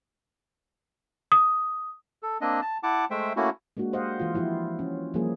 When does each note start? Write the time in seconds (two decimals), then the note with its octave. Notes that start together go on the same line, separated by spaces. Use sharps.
1.32 D#6
2.23 A4
2.41 A#3 C4 D4 D#5
2.62 A5
2.83 E4 F#5 A5 D6
3.11 G#3 A3 C5 E5 G5
3.36 A3 A#3 C#4 E4 F#4
3.77 G#3 A#3 D4 F#4
3.93 G4 C5 D#5 F5 F#5
4.19 E3 F4
4.34 F3 E4 F4 G4
4.79 C#4
5.14 F3 G3 A#3 G#4